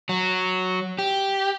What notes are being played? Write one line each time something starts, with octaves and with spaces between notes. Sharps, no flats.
F#3
G4